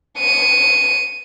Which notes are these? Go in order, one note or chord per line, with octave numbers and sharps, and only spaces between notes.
C#7 D#7